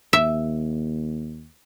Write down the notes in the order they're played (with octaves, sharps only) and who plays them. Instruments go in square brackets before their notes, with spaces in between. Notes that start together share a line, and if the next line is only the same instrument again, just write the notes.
[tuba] D#2 [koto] E5